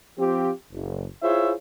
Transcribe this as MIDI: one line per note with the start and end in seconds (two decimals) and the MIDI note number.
0.18 0.51 53
0.18 0.51 60
0.18 0.51 65
0.18 0.51 67
0.71 1.05 30
1.22 1.52 64
1.22 1.52 65
1.22 1.52 68
1.22 1.52 72
1.22 1.52 73
1.22 1.52 76